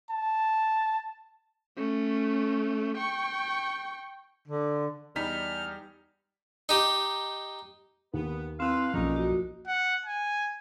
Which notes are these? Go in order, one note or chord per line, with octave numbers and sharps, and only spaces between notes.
A5
A3 C#4
G5 C#6
D3
E2 G3 D#4 F6 B6
D#4 G4
D#2 B3
A2 C4 E4 B4 F5
B1 G#2 D3 F3 A#3 C#4 D#4 F4
F#4
F#5
G#5